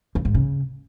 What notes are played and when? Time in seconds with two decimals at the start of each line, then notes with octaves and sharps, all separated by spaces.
0.15 F2
0.25 G#2
0.35 C#3